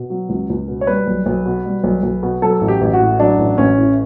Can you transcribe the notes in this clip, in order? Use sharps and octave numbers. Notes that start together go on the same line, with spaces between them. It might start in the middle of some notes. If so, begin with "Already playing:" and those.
Already playing: B2
F#3
C#2
C#2
B2
C#5
G3 B4
B1
B1
B2
G3
B1
B1
B2
F#3 A4
A1
G4
A1
F#4
A2
F#3 D4
A1
A1 C#4
A2